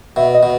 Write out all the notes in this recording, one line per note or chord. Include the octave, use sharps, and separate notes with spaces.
B2 E5
D#5
B2